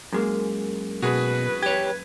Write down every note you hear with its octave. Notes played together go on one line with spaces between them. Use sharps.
F#2 G#3 A#3
B2 F#4 G#4 B4
G4 C#5 G#6